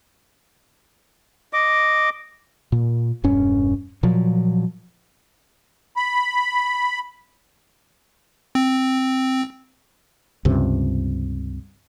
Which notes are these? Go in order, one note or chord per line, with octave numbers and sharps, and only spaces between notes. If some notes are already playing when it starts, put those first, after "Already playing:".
D#5 D6
A#2
E1 G2 C#4
A#2 F3 F#3
B5
C4
C#2 G2 C3